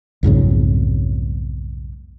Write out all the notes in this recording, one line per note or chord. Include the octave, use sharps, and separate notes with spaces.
B1 F2 G#2 C#3